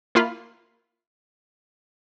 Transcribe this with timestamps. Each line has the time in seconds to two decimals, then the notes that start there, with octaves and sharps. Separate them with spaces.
0.15 A#3 E4 F4 F5 B5